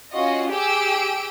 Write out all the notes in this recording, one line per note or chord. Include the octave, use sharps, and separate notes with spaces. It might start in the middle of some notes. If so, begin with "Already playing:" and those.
C#4 F4 F#4 D#5
G4 G#4 G5 E6 D7